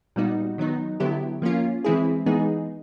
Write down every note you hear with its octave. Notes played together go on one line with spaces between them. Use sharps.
A#2 G3 B3 D#4 F#4
D#3 F#3 B3 D#4
D3 F#3 B3 E4 G4
F3 A#3 C#4 F4
E3 G#3 C4 E4 G#4
E3 G#3 B3 D#4 G#4